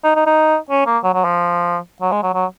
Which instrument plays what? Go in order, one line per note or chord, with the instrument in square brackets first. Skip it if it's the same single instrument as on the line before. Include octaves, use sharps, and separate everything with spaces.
[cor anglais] D#4
D#4
D#4
C#4
A#3
F#3
F#3
F3
F#3
G#3
F#3
F#3